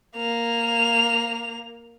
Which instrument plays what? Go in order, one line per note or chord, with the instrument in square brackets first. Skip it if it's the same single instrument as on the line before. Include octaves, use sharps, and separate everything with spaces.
[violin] A#3 F7